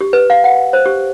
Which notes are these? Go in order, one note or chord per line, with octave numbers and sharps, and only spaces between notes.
G4
B4
F5
F#5
C5
G4